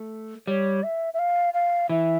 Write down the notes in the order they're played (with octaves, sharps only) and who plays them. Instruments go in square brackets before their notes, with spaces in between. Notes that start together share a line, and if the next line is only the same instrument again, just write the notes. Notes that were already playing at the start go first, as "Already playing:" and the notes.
Already playing: [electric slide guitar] A3
[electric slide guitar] G3 [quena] C#5
[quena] E5
E5
F5
F5
[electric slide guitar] E3 [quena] E5